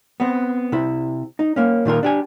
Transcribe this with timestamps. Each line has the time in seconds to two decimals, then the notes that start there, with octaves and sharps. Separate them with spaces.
0.20 B3 C4
0.72 C3 E4
1.39 D#4
1.56 A#3 C#4
1.85 A#2 D#3 F4 A#4
2.03 D4 G4 G#5